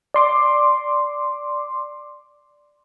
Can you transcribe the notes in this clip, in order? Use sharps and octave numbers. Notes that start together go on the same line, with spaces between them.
D5 C6 D6